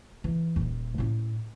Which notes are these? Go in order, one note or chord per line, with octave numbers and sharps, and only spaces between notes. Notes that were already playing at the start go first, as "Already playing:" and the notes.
E3
D#1 D#4
A2 C#4